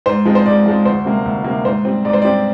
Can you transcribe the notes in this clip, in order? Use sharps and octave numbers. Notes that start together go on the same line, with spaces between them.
G#2 C5
F3 G#3 C4
C5
G#2 D5
F3 G#3 C4
D2 C5
C3 G3 A#3
D2
C3 G3 A#3
G#2 C5
G3 C4
G#2 D5
C5
G3 C4 D5